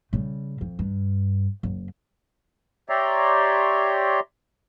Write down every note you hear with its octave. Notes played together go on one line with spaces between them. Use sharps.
C#3 G3
F2
G2
F#1
G4 C#5 D5 E5 A#5 C6